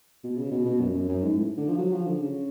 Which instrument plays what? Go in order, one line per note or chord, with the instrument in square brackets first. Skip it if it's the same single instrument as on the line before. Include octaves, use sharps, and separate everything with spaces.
[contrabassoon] B2
C#3
B2
B2
F#2
F#2
F#2
G#2
A2
D3
F3
F#3
F3
D3
C#3